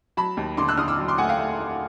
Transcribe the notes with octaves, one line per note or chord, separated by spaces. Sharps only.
F#3 A5 B5
D#2
D3 C6 D6
E6 F#6
D3 D#6 F6
D6 E6
F#3
C6 D6
A3 F#5 G#5
F5 G5
A3
A3